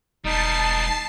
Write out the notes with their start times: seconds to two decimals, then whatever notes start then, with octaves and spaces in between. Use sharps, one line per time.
0.24 E1 G3 B3 D#4 A5 C7